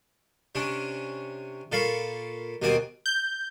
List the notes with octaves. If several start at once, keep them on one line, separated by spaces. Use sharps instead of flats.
C3 C#4 D4
A#2 A4 F5 B5 C#6
D#2 B2 A#3 C4 D5 G#5
G6